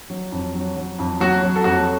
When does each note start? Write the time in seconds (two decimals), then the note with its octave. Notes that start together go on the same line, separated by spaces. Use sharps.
0.10 F#3
0.32 F2
0.55 F#3
0.76 F#3
0.99 F2
1.20 F#3 F#4
1.42 F#3
1.56 A4
1.64 F2 F#4